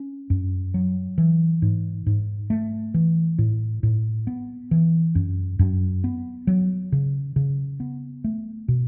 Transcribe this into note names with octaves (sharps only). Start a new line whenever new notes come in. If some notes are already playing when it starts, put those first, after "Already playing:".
Already playing: C#4
F#2
F#3
E3
G#2
G#2
A3
E3
A2
A2
B3
E3
F#2
F#2
B3
F#3
C#3
C#3
B3
A3
B2